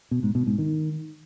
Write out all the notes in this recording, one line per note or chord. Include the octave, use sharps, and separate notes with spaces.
B2
G#2
B2
G#2
D#3